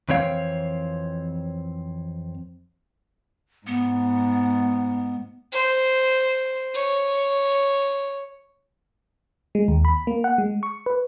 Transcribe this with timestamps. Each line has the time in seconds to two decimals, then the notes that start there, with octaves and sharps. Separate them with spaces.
0.09 F2 E3 C4 C#5 F5
3.67 G#2 B3
5.53 C5
6.74 C#5
9.55 G#3
9.68 D#2
9.85 B5
10.07 A#3
10.24 F#5
10.38 G#3
10.63 C#6
10.86 B4